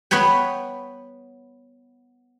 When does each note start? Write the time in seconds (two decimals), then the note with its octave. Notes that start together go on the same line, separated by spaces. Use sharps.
0.11 B3 B4 C#5 G5